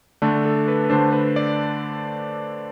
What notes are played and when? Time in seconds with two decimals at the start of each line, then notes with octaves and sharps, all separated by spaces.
0.22 D3 A3 D4 D5
0.45 A4
0.68 B4
0.84 B4
0.90 D3 A3 D4 C5
1.13 B4
1.36 D5